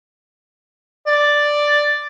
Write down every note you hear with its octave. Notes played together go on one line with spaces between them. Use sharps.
D5